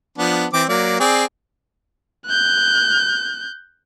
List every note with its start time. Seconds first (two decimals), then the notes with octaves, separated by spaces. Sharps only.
0.18 F3 B3 D4
0.53 E3 C4 D6
0.69 F#3 A#3 D5
1.00 C4 G#4 D5
2.26 F#6 G6